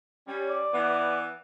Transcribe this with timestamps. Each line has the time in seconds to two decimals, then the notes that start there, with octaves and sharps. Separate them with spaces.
0.27 G3 C#4
0.49 D5
0.72 E3 B3